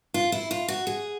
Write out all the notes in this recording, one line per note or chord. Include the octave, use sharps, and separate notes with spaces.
F4
E4
F4
F#4
G#4